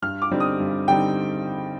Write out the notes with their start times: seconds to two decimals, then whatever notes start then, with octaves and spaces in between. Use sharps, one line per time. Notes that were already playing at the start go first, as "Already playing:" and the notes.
0.02 G2 F6
0.22 D6
0.31 D3 G3 C4 D#4
0.40 D#6
0.60 G2
0.88 D3 G3 C4 D#4 G5